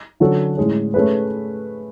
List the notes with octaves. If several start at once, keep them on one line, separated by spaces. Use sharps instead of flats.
D3 F#3 C#4 F#4 A4
A2 G#3 C#4
A3 C#4 G#4 B4